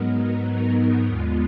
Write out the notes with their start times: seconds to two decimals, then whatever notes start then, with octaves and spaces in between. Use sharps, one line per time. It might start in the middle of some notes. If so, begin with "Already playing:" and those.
Already playing: G#2 F#3 B3 D#4 A#4
1.06 D#2 D3 G#3 B3 F4